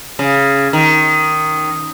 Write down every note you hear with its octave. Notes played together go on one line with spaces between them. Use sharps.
C#3
D#3